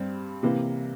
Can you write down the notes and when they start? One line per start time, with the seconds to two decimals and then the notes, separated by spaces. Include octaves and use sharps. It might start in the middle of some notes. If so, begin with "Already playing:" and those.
Already playing: G2 G3 C4
0.43 C3 E3 A#3